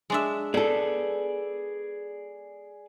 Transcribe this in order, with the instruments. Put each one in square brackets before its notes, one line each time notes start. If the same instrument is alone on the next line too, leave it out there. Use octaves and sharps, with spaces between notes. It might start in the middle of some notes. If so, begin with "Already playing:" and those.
[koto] G#3 D4 E5
[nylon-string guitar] B3 A4 [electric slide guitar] G#4 D5